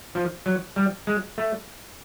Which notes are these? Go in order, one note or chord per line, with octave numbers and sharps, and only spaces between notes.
F3
F#3
G3
G#3
A3